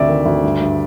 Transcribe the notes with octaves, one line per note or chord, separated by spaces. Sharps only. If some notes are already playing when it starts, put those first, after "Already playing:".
Already playing: D2 C3 D5 E5
D#3
D2
G2
G2